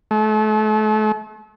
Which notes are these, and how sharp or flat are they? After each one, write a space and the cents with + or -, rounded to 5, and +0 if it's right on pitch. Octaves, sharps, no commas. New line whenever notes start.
A3 -35